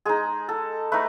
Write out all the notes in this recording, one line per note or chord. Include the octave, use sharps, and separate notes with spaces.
G#3 D#4 G#4
A4
A3 D#4 B4